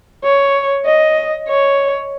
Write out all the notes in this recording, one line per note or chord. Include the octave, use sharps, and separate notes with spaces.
C#5
D#5
C#5